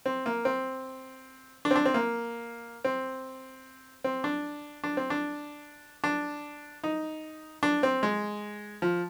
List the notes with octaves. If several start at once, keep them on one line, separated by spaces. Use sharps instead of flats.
C4
A#3
C4
D4
C4
D4
C4
A#3
C4
C4
D4
D4
C4
D4
D4
D#4
D4
C4
G#3
F3